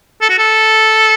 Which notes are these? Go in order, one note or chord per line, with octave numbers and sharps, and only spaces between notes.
A4
F#4
A4